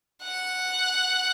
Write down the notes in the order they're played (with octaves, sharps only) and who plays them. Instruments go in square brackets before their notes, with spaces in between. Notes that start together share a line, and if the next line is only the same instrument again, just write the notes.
[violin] F#5